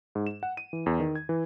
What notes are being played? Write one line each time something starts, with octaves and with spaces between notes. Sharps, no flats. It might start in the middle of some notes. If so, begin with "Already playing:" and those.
G#2
E7
F#5
D#7
E3
E2
D#3
G#6
E3